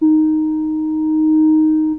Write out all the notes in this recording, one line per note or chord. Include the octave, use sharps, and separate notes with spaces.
D#4